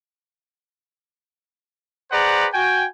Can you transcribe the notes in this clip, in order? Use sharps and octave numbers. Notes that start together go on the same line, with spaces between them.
G#4 B4 C5 D5 F#5 A#5
F#4 G5 G#5